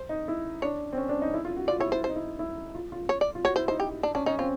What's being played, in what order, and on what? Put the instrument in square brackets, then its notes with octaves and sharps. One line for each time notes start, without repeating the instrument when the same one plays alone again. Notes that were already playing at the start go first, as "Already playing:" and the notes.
Already playing: [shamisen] C5
[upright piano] D#4
E4
[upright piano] D4 [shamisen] C#5
[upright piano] C4
C#4
D4
D#4
E4
F4
F#4
[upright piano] F4 [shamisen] D5
[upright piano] E4 [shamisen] C#5
[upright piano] E4 [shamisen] C5
[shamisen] C5
[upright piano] D#4
E4
E4
F4
F4
[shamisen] C#5
D5
[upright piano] F4
[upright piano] F#4 [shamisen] C#5
[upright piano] E4 [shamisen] C5
[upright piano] D#4 [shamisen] C5
[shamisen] G4
D4
[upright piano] C#4 [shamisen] D4
[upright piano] C#4 [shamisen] D#4
[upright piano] C4 [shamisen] F4